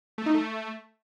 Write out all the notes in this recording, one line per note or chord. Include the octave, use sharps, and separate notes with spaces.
A3
D#4
A3